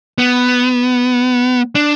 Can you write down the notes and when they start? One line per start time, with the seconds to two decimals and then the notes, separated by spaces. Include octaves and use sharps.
0.18 B3
1.75 D4